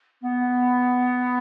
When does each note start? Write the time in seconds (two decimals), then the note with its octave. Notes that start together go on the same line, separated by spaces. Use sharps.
0.22 B3